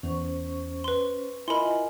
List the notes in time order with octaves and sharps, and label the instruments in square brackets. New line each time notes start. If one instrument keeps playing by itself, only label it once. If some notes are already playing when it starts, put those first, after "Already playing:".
[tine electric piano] E2 [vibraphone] C#4 C5 C#6
[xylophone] B4 C6
[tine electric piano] E4 A#4 [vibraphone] F4 D#5 G#5 [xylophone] B5 C6